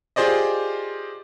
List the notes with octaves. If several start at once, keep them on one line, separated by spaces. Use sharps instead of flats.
F4 G4 G#4 C5 D5 D#5